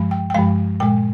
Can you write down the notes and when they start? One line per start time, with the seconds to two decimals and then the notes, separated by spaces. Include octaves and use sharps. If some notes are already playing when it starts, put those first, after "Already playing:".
Already playing: G2 F3 G#3
0.11 G5
0.30 G5
0.34 G2 F3 G#3 F5
0.80 A#2 G#3 G5